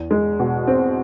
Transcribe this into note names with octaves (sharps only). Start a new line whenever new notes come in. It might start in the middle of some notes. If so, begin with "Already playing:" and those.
Already playing: E2
G#3
B2
C4